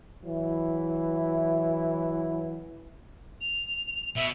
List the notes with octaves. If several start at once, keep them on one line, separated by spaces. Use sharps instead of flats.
E3 F#3 E4
F7
B2 E5